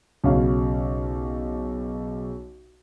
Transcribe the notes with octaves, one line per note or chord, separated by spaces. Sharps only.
B1 C#3 F#4 C#5 F5